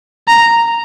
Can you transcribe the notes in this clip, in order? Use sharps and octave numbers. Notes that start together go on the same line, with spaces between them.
A#5